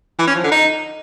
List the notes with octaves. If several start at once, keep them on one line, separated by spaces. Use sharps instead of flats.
E3
C#4
F3
D3
D#4